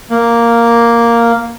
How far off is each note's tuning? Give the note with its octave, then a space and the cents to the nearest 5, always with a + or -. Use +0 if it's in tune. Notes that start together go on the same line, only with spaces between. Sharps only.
A#3 +0